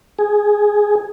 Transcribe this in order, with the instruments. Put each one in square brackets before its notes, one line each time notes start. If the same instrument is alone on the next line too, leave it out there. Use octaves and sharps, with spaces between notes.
[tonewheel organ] G#4